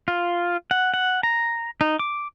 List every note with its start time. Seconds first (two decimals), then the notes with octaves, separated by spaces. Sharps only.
0.08 F4
0.71 F#5
0.94 F#5
1.23 A#5
1.81 D#4
1.99 D6